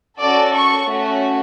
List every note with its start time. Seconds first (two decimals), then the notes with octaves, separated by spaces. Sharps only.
0.21 C#4 F#4 A4 D5
0.54 C#6
0.86 A3 C#4 F#4